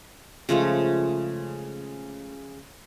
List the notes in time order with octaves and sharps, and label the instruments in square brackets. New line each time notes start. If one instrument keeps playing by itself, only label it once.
[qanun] C#3 F3 G#3 A3